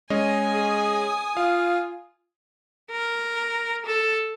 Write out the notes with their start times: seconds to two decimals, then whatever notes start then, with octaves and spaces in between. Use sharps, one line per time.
0.10 G#3 C#4 D#5 G#5 D#6
0.53 G#4
1.37 F4 F5
2.91 A#4
3.86 A4